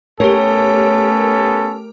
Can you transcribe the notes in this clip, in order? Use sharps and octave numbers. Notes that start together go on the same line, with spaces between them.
A3 B3 C#4 G4 A4 A#4 C#5